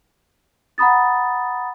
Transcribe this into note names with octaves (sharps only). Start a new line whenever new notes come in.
F#5 A#5 B5 D#6 A6